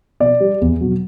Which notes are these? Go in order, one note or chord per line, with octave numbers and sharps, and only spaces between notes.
B2 D5
G3
E2
B2 F#3